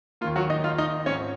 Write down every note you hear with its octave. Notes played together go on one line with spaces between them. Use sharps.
D#2 D#3 A#3 F4
F#3 F#4
D#4 D#5
F4 F5
D#4 D#5
G#2 F3 C4 C#4 C#5